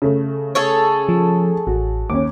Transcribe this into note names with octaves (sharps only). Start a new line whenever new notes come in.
C#3 A3
G#4 A4 C#5
F3
A1 F#4
D#2 C#4 D6